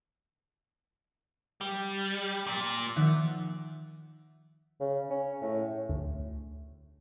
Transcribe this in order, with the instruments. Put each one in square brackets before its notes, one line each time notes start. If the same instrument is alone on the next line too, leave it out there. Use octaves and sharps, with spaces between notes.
[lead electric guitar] G3
A#2
[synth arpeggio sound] D#3 F3 E5 F#5
[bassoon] C#3
C#4
A2
[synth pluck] D2